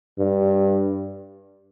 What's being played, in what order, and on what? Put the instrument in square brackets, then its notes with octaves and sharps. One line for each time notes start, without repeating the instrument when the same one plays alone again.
[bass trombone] G2